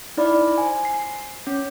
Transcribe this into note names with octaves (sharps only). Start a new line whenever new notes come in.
D#4 E4 D5 B5
C5 G#5
C7
C#4